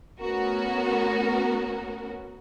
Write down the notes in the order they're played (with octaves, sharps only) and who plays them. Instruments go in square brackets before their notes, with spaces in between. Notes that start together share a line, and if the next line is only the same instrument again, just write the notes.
[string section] A3 B3 C#4 F#4 A#4